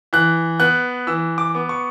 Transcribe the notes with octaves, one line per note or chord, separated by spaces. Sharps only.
E3 F#6
B3 F#6
E3 E6
D6
B3
C#6